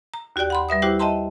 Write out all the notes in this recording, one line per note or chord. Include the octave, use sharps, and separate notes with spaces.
A#5
D#2 F#4 G4 D5 G5
F#5 B5 C6
G3 B4 E5 D#6
E4 F#4 G4 C5 G5 D6
D#5 E5 G5 A5 A#5 C6